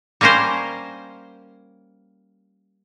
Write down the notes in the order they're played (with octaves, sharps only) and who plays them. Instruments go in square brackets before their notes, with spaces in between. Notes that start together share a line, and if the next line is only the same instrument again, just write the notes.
[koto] G3 A#3 C#4 A#4 C5